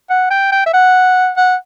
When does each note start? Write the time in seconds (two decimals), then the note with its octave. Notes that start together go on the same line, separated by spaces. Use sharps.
0.10 F#5
0.30 G5
0.52 G5
0.66 E5
0.74 F#5
1.37 F#5